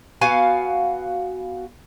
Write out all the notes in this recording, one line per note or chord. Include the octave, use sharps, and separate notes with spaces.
B3 F#4 F5 G#5